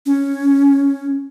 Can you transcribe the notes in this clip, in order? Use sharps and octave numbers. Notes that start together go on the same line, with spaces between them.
C#4